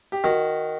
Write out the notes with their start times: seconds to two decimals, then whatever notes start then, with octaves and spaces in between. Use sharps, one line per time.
0.12 G4
0.24 D#3 F#4